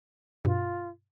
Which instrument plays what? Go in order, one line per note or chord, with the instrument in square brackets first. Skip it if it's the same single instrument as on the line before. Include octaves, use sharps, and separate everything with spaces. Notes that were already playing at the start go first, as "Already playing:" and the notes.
[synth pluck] G2 B2 [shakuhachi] F4